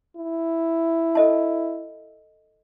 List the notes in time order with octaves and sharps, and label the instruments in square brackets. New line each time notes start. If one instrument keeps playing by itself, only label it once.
[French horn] E4
[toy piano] A4 D#5 A5